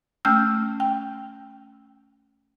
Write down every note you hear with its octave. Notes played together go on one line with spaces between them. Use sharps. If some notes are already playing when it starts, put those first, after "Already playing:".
A3 C#4 G5 E6 F6 G6
G5